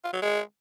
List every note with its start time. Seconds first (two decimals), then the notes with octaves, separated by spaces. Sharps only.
0.04 F4
0.13 F#3
0.22 G#3